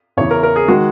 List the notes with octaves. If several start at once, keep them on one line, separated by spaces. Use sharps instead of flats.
E2 C#3 E3 C#5
A#4
A#4
G#4
D#3 G#3 F#4